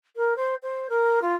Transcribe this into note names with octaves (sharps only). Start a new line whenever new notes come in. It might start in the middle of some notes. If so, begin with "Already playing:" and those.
A#4
C5
C5
A#4
F4